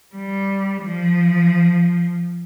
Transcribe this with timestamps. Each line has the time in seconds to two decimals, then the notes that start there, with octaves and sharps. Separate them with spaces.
0.15 G3
0.82 F3